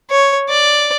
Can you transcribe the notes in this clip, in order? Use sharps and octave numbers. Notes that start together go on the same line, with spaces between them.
C#5
D5